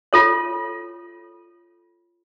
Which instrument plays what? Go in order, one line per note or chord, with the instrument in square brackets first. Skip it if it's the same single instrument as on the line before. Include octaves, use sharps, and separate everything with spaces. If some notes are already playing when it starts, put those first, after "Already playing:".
[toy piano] F4 A4 C#5